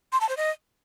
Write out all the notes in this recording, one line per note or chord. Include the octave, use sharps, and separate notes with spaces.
C6
A5
C5
D#5